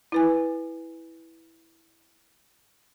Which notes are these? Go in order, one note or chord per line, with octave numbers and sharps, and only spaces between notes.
E4 B4 G#5